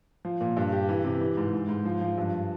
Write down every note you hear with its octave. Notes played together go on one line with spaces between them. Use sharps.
F3
A#2
G2
G4
E3
C3
E3
G#2
G#2
G#2
F3
F3
G2